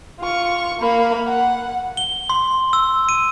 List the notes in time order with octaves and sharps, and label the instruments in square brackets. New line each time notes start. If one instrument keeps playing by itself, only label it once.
[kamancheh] F4 C#6
A#3 B5
F#5
[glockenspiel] G7
C6
E6
D#7